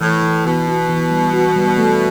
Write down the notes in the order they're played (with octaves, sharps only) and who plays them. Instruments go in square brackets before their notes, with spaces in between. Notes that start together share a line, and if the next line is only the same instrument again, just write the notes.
[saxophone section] A2 [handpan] E3
[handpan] E3
[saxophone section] B2 [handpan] E3
[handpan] F#4
E3
G3
F#4
G3
A3